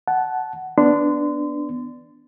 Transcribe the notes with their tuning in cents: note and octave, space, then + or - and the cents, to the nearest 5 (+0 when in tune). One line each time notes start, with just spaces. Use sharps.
F#5 +10 A5 -15
B3 +5 D4 +0 C6 -30